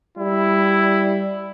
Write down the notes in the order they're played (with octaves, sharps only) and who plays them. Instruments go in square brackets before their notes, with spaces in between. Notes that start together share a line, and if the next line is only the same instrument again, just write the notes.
[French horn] G3 [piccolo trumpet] E4